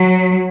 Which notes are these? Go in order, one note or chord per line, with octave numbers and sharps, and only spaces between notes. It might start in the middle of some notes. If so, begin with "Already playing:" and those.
Already playing: F#3